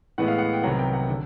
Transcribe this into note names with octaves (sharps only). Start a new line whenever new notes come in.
A2 E3 G#3 B3 F#5
F5
F#5
G5
C2 C3 D#3 F#3 B3 F#5
G5
F#5
D3